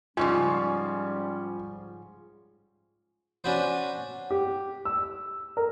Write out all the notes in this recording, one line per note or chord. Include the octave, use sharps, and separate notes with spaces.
G#2 C#3 F3 G3 C#4 F4 G#5 C#6
C#4 D4 F#4 B4 C5
G4
E6
A#4